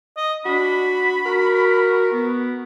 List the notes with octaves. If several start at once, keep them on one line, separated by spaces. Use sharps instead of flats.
D#5
D4 F#4 B5
F#4 A#4
B3